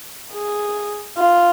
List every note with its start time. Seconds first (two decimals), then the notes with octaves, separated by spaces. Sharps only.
0.32 G#4
1.17 F4